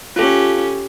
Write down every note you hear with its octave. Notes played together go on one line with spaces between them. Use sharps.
C#4 F4 G4 A4